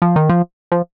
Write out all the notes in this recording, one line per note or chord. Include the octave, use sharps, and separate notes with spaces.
F3
D#3
F3
F3